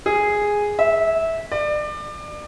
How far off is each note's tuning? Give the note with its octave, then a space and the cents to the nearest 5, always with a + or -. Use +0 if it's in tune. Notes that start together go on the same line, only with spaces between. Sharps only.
G#4 -5
E5 -15
D5 +30